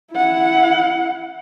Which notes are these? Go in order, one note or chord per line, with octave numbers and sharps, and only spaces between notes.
E4 F#5